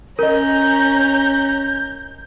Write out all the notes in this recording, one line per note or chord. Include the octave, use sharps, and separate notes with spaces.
C#4 A#4 D#5 A#5 G6